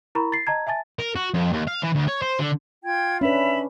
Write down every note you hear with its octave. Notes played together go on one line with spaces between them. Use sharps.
E4 A#4 A#5 B5 C#6
A6 C7
D#5 A5 A#5 G#6
E5 G#5 A5 A6
A#4
F#4
F2
D#2
F5
E3
D2
C#5
C5
D3
F4 G5 G#6
C#4 D4 B4 E5 B5